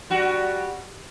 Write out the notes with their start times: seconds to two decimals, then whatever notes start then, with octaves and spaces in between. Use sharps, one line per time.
0.10 G3 F#4